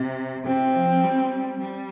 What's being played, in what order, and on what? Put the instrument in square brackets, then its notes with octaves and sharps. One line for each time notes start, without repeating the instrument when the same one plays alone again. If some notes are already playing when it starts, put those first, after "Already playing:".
Already playing: [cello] C3
[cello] C3 [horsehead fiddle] C4
[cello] F3
G3
G3